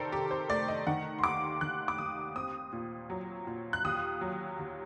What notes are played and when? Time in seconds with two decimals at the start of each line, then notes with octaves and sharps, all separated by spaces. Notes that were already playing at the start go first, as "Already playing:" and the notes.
Already playing: C3 D#3 A4 A#4 C5 D5
0.12 C3 G4
0.31 C5
0.49 A3 D5
0.68 D#5
0.87 D#3 F#5
1.19 C6
1.24 D#2 D6
1.61 D#3 F#6
1.88 D6
1.98 D#2 D#6
2.36 C4 D#6
2.72 A#2
3.10 F#3
3.47 A#2
3.73 F#6
3.84 D#2 D#6
4.21 F#3
4.59 D#2